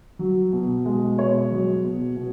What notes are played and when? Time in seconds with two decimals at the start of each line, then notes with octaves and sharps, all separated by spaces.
0.19 F#3
0.53 B2
0.85 G#3
1.18 B2 C#5
1.51 F#3
1.85 B2
2.16 B2